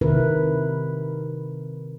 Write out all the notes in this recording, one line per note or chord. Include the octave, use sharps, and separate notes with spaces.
C3 D#3 E4 A#4 B4